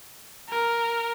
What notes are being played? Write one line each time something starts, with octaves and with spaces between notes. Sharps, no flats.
A#4